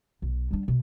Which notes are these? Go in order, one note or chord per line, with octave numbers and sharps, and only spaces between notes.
B1
G3 D4
B2